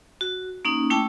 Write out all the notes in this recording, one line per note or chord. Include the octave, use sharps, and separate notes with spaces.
F#4
A#3 C#4 D#4
A3 C#4 E4 G5 A5 D6